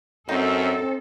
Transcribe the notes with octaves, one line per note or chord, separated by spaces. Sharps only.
F#2 C4 D#4 A4 C5 G5